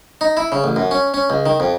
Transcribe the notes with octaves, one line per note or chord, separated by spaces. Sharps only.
D#4
E4
C#3
A1
F#2
C#4
C#4
C#2
D#3
F2